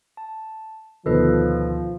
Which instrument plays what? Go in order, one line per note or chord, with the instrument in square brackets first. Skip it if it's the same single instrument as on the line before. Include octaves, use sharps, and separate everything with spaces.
[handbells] A5
[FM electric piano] D2 B2 D#3 [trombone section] F3 [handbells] A4 B4 D#5